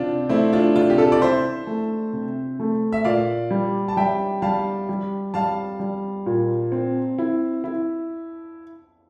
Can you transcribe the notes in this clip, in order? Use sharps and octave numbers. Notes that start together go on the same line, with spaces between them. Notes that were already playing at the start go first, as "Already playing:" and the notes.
Already playing: C3 C4 D4 F4
A3 C4 E4
D4 F4
C3 D4 F4
G4
F4 A4
D5
E4 C5 E5
A3
C3
A3
E5
A#2 D5 F5
G3
A5
G3 E5 G5
G3 F5 A5
G3
G3 F5 A5
G3
A#2
C4
E4
E4